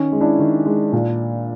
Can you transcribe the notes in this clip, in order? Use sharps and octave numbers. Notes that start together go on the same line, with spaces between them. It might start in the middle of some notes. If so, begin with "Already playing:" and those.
Already playing: D#3 C#4
G#3
D4 E4
D#3
G#3
A#2